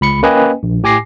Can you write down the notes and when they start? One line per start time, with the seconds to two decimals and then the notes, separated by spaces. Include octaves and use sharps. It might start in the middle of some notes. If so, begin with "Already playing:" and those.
0.01 C#2 B5 C#7
0.23 A#3 C#4 B4 D#5 G5 G#5
0.63 A#1
0.83 A2 G4 G#5 D6 A#6 C7